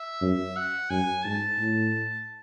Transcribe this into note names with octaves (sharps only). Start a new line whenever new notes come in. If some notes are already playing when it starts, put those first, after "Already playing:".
Already playing: E5
F#2
F#5
F#2 G#5
G#2 A5
A2